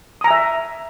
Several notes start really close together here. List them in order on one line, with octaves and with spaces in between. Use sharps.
D#6 A#5 G#5 E5